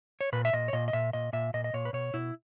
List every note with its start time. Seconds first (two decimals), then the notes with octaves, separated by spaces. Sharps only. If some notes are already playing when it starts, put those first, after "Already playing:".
0.21 C#5
0.33 A#2 B4
0.45 E5
0.53 A#2 D#5
0.68 C#5
0.73 A#2 D#5
0.88 D#5
0.93 A#2 E5
1.13 A#2 D#5
1.33 A#2 E5
1.54 A#2 D#5
1.64 D#5
1.74 A#2 C#5
1.85 B4
1.93 B2 C#5
2.14 B2 E4